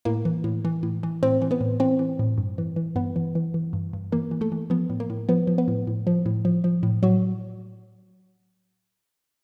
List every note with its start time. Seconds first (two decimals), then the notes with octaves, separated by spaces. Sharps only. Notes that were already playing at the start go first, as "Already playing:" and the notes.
0.05 A2 A#3 A#4
0.25 E3
0.44 A2
0.65 E3
0.83 A2
1.03 E3
1.23 A2 C4 C5
1.42 E3
1.51 B3 B4
1.61 A2
1.80 E3 C4 C5
1.99 E3
2.19 A2
2.38 G2
2.58 E3
2.76 E3
2.96 G2 B3 B4
3.16 E3
3.35 E3
3.54 E3
3.73 G2
3.93 G2
4.12 E3 A#3 A#4
4.31 E3
4.41 A3 A4
4.52 E3
4.70 F3 B3 B4
4.90 A2
5.00 A#3 A#4
5.10 A2
5.29 F3 B3 B4
5.47 F3
5.58 B3 B4
5.68 A2
5.87 A2
6.07 F3
6.26 A2
6.45 F3
6.64 F3
6.83 A2
7.03 A2 F#3 F#4